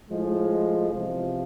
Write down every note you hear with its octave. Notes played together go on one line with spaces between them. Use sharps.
A2 F3 G#3
E2 C3 F3